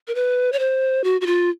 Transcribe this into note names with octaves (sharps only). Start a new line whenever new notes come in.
A#4
B4
C#5
C5
F#4
F#4
F4